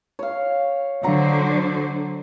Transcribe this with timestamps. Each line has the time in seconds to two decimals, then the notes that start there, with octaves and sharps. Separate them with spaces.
0.19 C#5 F5
1.03 D3 F#3 C5 F#5 A#5 C#6